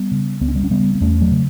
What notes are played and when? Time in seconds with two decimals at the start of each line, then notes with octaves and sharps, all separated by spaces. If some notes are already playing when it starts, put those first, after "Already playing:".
Already playing: G3 B3
0.11 C#3
0.41 C#2 B3
0.48 C#4
0.55 G3 B3
0.64 C#4
0.71 C#3 G3 B3
0.95 B3
1.01 E2 A3 C#4
1.21 F#3 A3
1.32 C#3